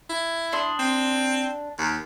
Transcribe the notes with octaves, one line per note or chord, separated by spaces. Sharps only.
E4
D4 C6 D#6
C4
D#2